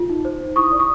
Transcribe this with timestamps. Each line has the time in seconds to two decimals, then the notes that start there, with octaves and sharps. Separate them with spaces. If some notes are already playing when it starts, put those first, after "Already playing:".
Already playing: F4
0.10 D#4
0.25 C5
0.41 D#4
0.56 E4 C#6 D#6
0.72 D5
0.79 C#6 D#6